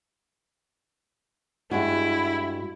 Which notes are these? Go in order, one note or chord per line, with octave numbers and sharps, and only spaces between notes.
G2 G#3 E4 F#4